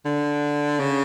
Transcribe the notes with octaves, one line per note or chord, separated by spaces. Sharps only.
D3
C#3